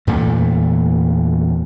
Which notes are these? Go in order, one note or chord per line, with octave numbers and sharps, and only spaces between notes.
E2 A#2 A3